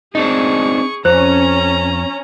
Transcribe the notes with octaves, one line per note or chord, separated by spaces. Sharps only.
C4 D4 D#4 G#4 D#5 C#6
F2 C#4 C5 A#5